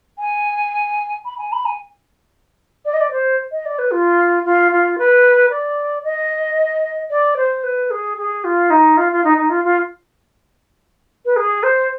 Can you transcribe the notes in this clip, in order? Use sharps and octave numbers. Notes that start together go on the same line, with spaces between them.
G#5
B5
G#5
B5
G#5
D5
D#5
D5
C5
D#5
D5
B4
F4
F4
F4
B4
D5
D#5
D5
C5
B4
G#4
G#4
F4
D#4
F4
F4
D#4
D#4
F4
F4
B4
G#4
C5